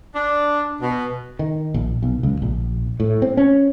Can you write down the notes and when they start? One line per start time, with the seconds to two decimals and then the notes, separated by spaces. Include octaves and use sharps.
0.15 D4
0.81 B2
1.39 D#3
1.74 A#1
2.03 B1
2.23 C#2
2.42 A#1
3.00 A2
3.22 C4
3.37 C#4